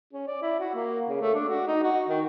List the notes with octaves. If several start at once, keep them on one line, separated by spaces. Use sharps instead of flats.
C#4
D5
E4
F#4
A#3
C#3
A3
D4
F#4
D#4
F#4
D#3